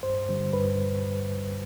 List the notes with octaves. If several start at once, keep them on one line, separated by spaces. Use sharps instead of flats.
G2 C5
D3 G3
G2 B4